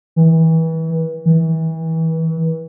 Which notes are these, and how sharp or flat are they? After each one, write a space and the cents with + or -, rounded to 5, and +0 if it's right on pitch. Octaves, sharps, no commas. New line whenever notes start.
E3 -30
E3 -30